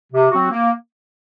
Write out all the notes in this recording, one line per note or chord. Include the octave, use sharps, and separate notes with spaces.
C3
F#3 C4 F#4
A#3